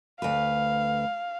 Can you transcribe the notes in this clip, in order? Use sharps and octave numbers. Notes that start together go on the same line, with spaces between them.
D2 B4 F5